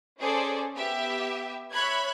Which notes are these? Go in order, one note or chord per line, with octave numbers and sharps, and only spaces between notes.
C#4 G#4 A4 C5 D5
B3 G4 E5
C#5 E5 B5 C#6 F#6 G#6